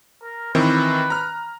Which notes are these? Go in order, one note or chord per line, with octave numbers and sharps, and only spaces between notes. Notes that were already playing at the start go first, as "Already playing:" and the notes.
A#4
D#3 E3 C4 B4
A#5 F6